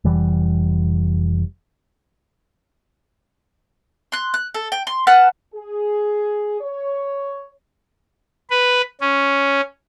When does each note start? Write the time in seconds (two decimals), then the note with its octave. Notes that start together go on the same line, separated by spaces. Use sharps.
0.05 F1 E3 G3
4.12 C6 F#6
4.34 F#6
4.54 A4
4.72 G5
4.87 C6
5.07 B4 F#5 A5 F6
5.55 G#4
6.61 C#5
8.50 B4
9.01 C#4